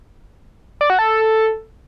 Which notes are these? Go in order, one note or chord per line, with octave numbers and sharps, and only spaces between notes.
D5
F#4
A4